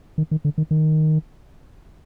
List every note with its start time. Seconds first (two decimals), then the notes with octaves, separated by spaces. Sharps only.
0.18 D#3
0.31 D#3
0.45 D3
0.58 D#3
0.71 D#3